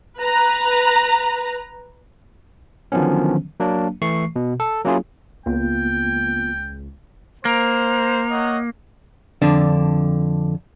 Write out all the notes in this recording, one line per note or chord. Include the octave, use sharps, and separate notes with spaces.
B4 A#5
D3 D#3 F3 F#3 B3 C#4
F#3 A#3 D4
E3 A3 C#6 C7
B2
A4
F#3 A#3 C#4 E4 F4 G#4
C#2 A#3 B3 F4 G5
A#3 C5 A#5
C#5 D#5 F#5
F2 D3 D4